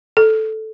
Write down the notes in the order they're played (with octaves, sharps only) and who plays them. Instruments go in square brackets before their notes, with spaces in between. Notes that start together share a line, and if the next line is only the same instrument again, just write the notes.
[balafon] A4